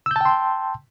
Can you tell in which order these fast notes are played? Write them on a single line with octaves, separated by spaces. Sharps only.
E6 G6 A5 G5 C6